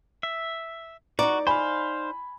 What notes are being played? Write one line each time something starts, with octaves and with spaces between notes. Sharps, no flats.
E5
D#4 F#4 D5 A#5
C5 F5 G#5 B5